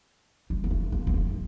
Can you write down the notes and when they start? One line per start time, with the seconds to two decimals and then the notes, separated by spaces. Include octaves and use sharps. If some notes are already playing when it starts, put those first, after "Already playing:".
0.50 G3
0.64 A#3
0.71 A3
0.92 A#3
1.07 A#3
1.14 A3